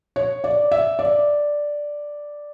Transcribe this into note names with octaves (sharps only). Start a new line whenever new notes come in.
C#5
D5
E5
D5